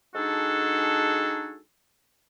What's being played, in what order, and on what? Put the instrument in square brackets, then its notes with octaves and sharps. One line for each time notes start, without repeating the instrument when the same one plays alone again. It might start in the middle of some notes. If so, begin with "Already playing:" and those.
[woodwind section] G#3 D4 D#4 F#4 G#4 A4